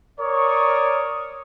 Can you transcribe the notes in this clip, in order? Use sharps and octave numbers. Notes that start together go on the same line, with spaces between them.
A#4 C#5 D5 C#6 D#6